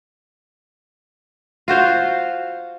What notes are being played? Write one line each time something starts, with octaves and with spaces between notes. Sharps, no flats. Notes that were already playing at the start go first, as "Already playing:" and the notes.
F4 F#4 C5 F5